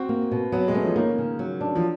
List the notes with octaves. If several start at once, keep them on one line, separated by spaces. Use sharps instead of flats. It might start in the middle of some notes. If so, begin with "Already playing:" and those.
Already playing: C4 F#4
A#3
B2
F#3 B3
G#3
A3 C#4
F3
D#3 A#3
C#3
F#3
D4
F3